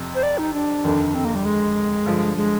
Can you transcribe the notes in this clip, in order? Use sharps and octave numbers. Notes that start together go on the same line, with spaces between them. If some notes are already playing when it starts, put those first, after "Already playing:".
Already playing: F2 C3 F3
C5
D5
D#4
D4
F1 D#2 D3
C4
A#3
G3
G#3
G2 D3 F3
G#3